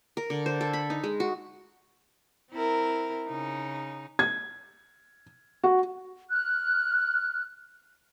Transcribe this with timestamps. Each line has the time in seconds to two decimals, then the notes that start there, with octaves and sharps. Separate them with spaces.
0.17 A#4
0.30 D3
0.46 C5
0.61 A4
0.73 B5
0.90 D#4
1.04 G#3
1.20 F#4
2.52 C4 E4 A#4
3.28 C#3 D#4
4.19 G#6
5.64 F#4
6.30 F6 F#6